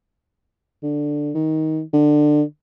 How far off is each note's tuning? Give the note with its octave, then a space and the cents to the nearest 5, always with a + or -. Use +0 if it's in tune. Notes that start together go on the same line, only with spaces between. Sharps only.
D3 +5
D#3 +15
D3 +20